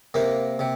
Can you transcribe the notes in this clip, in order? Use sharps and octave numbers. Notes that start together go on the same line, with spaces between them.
C3 A#3
C3